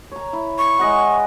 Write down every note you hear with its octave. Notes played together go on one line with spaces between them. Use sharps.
C#5 A#5
E4
C#6
G#3 D#5 F#5